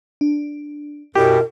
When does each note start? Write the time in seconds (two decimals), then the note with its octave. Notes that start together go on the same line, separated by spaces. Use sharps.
0.21 D4
1.15 F#2 B2 E4 G4 A#4 C#5